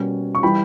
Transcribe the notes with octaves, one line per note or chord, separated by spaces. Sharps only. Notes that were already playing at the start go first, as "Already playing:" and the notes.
Already playing: B2 G3 A#3 C#4
C#6
E3 G3 G5 B5